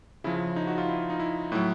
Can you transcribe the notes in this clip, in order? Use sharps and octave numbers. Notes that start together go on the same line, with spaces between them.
C#3 F3 E4
D#4
F#4
F4
E4
D#4
E4
A2 F#3 E4